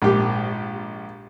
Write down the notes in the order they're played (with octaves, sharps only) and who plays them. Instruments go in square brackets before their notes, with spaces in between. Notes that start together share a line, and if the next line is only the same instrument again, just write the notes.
[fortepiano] A#1 G#2 G4